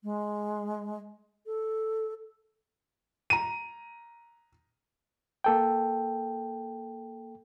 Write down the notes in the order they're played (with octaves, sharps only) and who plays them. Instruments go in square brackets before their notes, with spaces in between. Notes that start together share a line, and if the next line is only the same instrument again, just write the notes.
[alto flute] G#3
A4
[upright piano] A#5 D#7
[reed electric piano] A#3 A4 G5